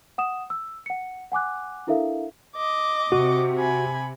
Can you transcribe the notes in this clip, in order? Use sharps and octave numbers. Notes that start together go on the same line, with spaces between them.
F#5 D#6 E7
E6
F#5 C#7
F#5 G#5 D6 F#6
D4 E4 A4 A#4 E5 F5
D#5 D6
C3 F#4
G#5 B5